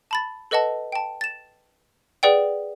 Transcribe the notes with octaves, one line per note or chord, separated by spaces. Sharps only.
A5 B5 A6
A4 B4 D#5 F#5 A5
G5 A5
A6 E7
G#4 B4 D5 F#5 G5